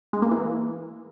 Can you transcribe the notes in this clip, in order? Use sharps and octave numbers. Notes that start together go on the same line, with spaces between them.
G#3
A#3
E3